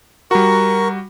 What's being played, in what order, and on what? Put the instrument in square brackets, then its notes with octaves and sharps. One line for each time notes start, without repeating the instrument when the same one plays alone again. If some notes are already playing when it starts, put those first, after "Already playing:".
[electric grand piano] G3 F#4 [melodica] A#4 C#6